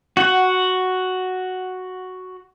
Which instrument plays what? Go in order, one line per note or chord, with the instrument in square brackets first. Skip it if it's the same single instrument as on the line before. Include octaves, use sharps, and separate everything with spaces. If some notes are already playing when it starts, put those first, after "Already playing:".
[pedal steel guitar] F#4 F#5